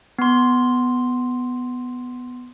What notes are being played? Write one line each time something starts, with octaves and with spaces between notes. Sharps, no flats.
B3 C6